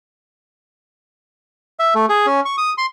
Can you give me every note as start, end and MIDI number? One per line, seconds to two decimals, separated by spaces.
1.79 1.94 76
1.95 2.06 57
2.09 2.26 68
2.26 2.40 61
2.45 2.56 85
2.58 2.73 87
2.78 2.86 84